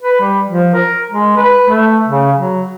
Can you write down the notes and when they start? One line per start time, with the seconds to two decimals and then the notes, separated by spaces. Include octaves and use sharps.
0.02 B4
0.20 G3
0.48 F3
0.74 A#4
1.10 G#3
1.36 B4
1.69 A3
2.08 C#3
2.36 F#3